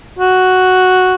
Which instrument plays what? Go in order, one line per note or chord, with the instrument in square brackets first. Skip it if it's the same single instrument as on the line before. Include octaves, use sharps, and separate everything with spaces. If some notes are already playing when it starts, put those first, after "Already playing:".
[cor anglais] F#4